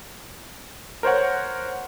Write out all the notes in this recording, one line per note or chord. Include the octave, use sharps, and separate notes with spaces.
A#4 C5 C#5 F#5